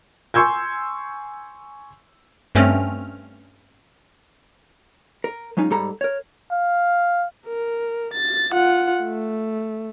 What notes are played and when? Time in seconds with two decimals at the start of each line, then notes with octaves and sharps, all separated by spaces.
0.34 G#5 C6 C#6 E6 G6 G#6
2.55 G2 A3 C4 C#4 F6
5.24 A#4
5.57 F#3 G#3 C#4 D#4 F4
5.70 G#2 G3 A4 A#5 B5
6.01 A#4 C#5
6.51 F5
7.47 A#4
8.13 A6
8.52 F4 F#5
9.03 A3